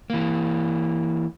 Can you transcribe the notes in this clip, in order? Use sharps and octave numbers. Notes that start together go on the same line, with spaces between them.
E3 A#3